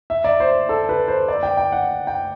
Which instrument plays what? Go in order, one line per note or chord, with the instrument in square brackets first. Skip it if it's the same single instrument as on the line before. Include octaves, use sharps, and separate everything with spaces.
[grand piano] E5
D5
C5
A4
B4
C5
D5
G5
G5
F#5
G5